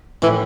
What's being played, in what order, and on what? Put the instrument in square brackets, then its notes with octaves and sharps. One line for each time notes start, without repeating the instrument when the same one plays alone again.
[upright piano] A2 [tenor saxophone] E3